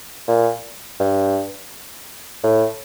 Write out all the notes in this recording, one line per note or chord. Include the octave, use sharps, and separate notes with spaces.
A#2
G2
A2